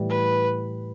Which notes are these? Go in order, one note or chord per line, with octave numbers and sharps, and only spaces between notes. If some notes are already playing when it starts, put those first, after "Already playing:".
Already playing: A2 E3 G3
B4